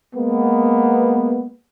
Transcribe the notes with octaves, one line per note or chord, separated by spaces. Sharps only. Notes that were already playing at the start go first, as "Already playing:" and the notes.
G#3 A#3 B3